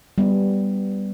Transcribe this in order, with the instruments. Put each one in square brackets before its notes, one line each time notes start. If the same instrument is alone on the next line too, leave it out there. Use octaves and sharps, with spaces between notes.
[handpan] G3 B3